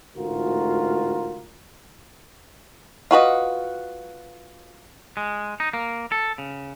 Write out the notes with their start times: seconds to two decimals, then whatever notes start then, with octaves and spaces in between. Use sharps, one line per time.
0.17 A1 D2 G#2 F4 F#4 A#4
3.11 F4 F#4 B4 D#5
5.17 G#3
5.60 D#4
5.73 A#3
6.12 A4
6.38 C#3